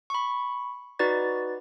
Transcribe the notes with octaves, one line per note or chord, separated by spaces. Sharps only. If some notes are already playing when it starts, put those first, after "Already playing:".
B5 C#6
D#4 F#4 B4 D5 A6